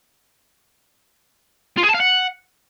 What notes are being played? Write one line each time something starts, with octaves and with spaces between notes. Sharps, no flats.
F4
G#4
A5
F5
F#5